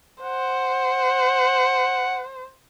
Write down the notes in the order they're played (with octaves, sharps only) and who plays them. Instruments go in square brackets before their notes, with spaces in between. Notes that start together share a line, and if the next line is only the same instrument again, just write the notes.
[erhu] C5 [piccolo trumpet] F#5